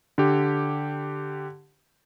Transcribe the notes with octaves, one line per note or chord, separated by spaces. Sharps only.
D3 G4